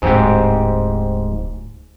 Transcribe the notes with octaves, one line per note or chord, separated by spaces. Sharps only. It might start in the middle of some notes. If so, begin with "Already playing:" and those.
D1 G#2 C4 G4